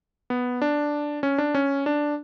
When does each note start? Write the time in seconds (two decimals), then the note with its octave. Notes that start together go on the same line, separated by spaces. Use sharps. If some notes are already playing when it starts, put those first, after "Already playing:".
0.30 B3
0.62 D4
1.23 C#4
1.38 D4
1.55 C#4
1.86 D4